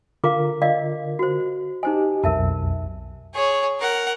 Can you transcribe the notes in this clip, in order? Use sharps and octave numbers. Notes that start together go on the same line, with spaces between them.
D3 F4 A#4 F5 A#5 D6
D5 D#5 F5
F#4 C5
D#4 G4 C5 D#5 G#5
B1 F2 A#4 E5 A5
G#4 C#5
A#4 F#5